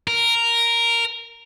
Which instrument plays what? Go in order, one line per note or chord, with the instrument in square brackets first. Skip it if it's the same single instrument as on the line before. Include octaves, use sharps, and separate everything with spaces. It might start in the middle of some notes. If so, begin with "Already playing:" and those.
[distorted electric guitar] A#4